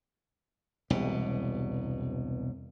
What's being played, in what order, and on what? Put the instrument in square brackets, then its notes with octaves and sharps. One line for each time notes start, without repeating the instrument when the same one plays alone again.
[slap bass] E1 C2 B2